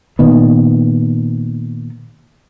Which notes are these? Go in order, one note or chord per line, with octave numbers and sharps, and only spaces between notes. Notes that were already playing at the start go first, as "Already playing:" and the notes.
A#2 D#3 B3